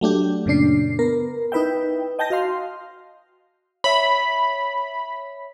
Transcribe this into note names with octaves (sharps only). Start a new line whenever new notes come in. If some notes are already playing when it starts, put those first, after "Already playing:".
F#3 A3 D4 G4
F#2 A#2 C#3 D4 C7
B3 A#4
D#4 E4 B4 E5 G5
D#5 G5 A5 G6 A#6
F#4 D#5 F5 C6
C#5 E5 B5